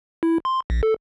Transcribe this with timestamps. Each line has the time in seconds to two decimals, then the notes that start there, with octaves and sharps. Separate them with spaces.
0.23 E4
0.45 C6
0.70 A#1
0.83 A4